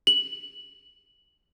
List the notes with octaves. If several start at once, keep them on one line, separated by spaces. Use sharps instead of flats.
F#7